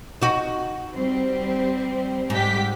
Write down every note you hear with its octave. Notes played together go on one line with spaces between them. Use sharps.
D#4 F#4
G3 C4
G#2 G3 G4 B6